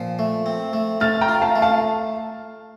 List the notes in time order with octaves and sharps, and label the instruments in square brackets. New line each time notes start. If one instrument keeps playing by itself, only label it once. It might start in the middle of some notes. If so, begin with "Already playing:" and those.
Already playing: [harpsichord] A#2 F3
A3
C4
A3
[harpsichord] A3 [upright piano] F6 A6
[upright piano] G5 A#5
[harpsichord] F4
[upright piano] F5 A5
[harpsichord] A3
[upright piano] F5 A5